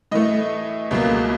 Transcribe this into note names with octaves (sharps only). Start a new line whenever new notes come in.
A2 E3 A3 D#5
C#2 B2 F#3 A#3